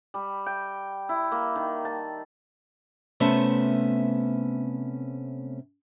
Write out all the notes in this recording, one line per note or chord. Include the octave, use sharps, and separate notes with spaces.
G3
G5
E4
A#3
D#3
A5
C3 A3 B3 C#4 C5 E5